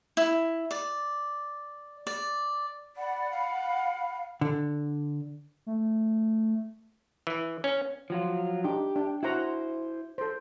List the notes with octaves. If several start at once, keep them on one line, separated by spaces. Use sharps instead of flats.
E4
D5
D5
D5 F#5 B5
F5
D3
A3
E3
C#4
F3 F#3 F4
D4 D#4 G4
D4
E4 F#4 C5 F#5 A#5
A4 C5